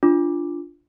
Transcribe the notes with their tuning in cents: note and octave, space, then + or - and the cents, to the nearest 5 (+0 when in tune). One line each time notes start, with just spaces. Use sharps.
D4 +0 F4 -10 D6 +0